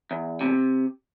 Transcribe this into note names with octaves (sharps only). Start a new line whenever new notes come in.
E2
C3